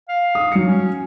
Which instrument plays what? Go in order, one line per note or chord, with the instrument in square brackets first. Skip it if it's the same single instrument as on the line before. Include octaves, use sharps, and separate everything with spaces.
[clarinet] F5
[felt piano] D#6
F#3 C#7
[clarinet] C#4